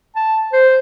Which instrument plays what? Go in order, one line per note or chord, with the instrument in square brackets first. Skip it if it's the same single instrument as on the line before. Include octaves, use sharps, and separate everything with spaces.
[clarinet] A5
C5